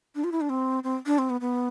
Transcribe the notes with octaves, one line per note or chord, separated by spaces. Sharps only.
D4
F4
E4
D4
C4
C4
D4
C4
B3
B3